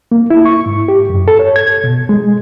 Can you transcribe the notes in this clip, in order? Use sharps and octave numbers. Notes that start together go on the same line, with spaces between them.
A#3
E4
C#6
G#2
G4
F#2
A4
C#5
G#6
B2
G#3